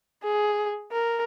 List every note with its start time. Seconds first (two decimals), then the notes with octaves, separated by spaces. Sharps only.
0.23 G#4
0.92 A#4